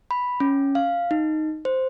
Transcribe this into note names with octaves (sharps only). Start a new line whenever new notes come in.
B5
C#4
F5
D#4
C5